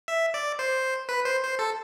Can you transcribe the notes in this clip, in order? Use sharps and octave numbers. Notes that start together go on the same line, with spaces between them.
E5
D5
C5
B4
C5
C5
A4